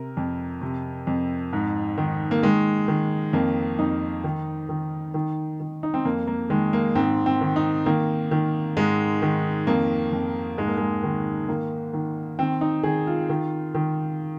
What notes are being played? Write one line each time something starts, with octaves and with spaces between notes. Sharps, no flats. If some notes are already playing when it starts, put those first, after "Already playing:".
Already playing: C3 A#4
F2
C3
F2
G#2
D#3
A#3
D#3 G#3
D#3
F2 A#3
F2 D#4
D#3
D#3
D#3
D#3
D#4
C4
F2 A#3
A#3
D#3 G#3
A#3
G#2 C4
C4
D#3
D#4
D#3 A#3
D#3
G#2 G#3
D#3
F2 A#3
F2
G#2 G#3
A#3
G#3
D#3
D#3 A#3
D#3
D#3 C4
D#4
D#3 G#4
F4
D#3
D#3